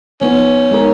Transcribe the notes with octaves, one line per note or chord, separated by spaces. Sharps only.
F3 B3 C#4 D#4
G#3 D#4 A#4